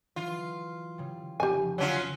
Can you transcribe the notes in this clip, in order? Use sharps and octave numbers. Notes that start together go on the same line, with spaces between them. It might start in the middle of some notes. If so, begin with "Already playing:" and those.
E3 F#3 F4
C#3 G3
F1 F3 G4 G#5
D3 F#3 C#4 F4 B6